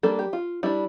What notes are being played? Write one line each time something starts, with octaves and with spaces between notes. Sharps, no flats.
G3 A#3 D4 A4
G4
F4
G3 D4 E4